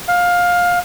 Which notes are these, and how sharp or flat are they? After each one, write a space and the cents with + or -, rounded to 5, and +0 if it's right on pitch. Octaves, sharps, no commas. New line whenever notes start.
F5 +20